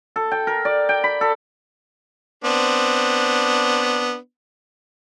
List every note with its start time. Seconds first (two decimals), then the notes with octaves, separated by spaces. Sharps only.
0.16 A4
0.31 G5
0.47 A#4
0.65 D5
0.89 G5
1.04 B5
1.21 A4
2.44 B3 C4 D4